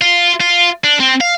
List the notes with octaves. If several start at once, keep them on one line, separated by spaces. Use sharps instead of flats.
F4
F4
D4
C4
F5